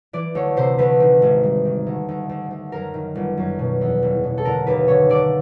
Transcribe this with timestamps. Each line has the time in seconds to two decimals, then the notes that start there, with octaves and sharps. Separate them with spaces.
0.13 E3 D5
0.35 D2 C#5
0.57 C3 C5
0.78 D2 B4
1.00 D#3
1.22 G#1
1.43 G2
1.65 D#3
1.86 D2
2.09 D2
2.29 D2
2.51 D2
2.72 F#2 A#4
2.94 D#3
3.15 G1
3.38 F#2
3.59 B2
3.81 E2
4.03 F#1
4.24 B2
4.38 A4
4.45 D3 A#4
4.67 D#2 B4
4.88 D3 C#5
5.09 D3 D5